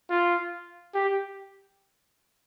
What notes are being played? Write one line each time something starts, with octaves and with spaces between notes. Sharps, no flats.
F4
G4